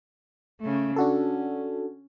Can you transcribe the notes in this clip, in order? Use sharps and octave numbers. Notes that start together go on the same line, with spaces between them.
C#3 A3
C#4 D4 F#4 A4